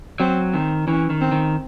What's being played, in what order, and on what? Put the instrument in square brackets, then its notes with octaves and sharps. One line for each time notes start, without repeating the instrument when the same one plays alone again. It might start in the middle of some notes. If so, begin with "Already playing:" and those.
[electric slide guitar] F#3 [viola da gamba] C4
[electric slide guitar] D#3 [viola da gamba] C4
[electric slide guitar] E3 [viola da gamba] C#4
[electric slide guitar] D#3
[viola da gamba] C4
[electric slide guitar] D#3